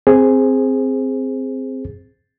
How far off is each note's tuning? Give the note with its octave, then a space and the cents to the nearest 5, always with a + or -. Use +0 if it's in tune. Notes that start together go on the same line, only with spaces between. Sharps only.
C4 +0 G#4 +0 C5 +0